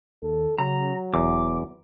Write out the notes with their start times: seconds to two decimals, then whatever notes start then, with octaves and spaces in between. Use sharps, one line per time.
0.22 D#2 A4
0.58 C#3 F#3 A#5
1.14 E1 E2 D6